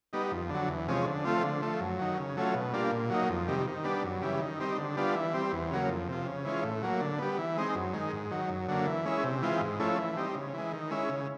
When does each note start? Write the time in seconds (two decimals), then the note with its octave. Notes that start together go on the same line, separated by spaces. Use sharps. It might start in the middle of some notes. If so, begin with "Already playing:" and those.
0.13 G3 B3 D#4
0.32 F2
0.50 D3 F#3
0.69 E2
0.88 C3 F3 G#3 C#4
1.06 D3
1.25 F3 A3 C4 F4
1.43 D3
1.62 F3 A3
1.80 F#2
1.99 D#3 F#3
2.18 C#3
2.37 F#3 A3 C#4 F4
2.54 B2
2.73 G3 A#3 D4 F4
2.91 A#2
3.10 F#3 A#3 D#4
3.29 F2
3.48 C3 D#3 G3
3.67 D#3
3.84 G3 B3 D4
4.04 F#2
4.22 C#3 E3 G3
4.41 D#3
4.60 G3 C4 D#4
4.78 D3
4.97 G3 B3 D4 F4
5.15 E3
5.34 G3 C4
5.53 E2
5.71 C#3 F#3 A#3
5.89 F2
6.08 C3 F3
6.27 C#3
6.45 E3 G#3 C#4 F4
6.63 A2
6.82 F#3 A#3
7.01 D3
7.19 G3 B3
7.38 E3
7.57 G#3 C4 D#4
7.75 F#2
7.93 D#3 G#3
8.12 G#2
8.31 D#3 F#3
8.49 F#2
8.68 D3 F#3 A#3
8.86 E3
9.05 G#3 C#4 E4
9.24 C3
9.42 E3 G#3 C4 F4
9.61 G#2
9.80 F3 A3 C#4 E4
9.98 E3
10.17 G3 C4 D#4
10.35 C#3
10.54 E3 G#3
10.73 D#3
10.91 G#3 C#4 E4
11.09 C#3